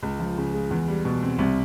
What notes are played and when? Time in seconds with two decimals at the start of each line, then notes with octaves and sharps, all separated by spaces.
0.03 C#2
0.20 F3
0.38 C#3
0.54 G#3
0.71 E2
0.88 G3
1.05 B2
1.23 C4
1.39 C2